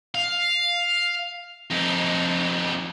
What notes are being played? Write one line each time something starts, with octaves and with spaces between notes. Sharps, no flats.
F5
F2 D#4